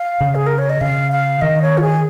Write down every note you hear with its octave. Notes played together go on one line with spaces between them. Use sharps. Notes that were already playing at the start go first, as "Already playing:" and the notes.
Already playing: F5
C#3
G#4
A#4
C#5
D#5
C#3 F5
F5
D#3 D#5
C#5
F4
G#4